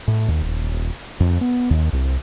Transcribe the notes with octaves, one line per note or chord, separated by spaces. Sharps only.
A2
D#2
D#1
F2
B3
D#2
C2